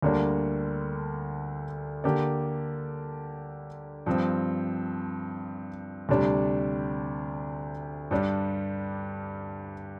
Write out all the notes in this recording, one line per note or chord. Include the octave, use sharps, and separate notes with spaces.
D2 D3 G3 A#3 D4
D3 A#3 G4 D5
G2 F3 C4
D2 C3 G3 D4
G2 G3 D4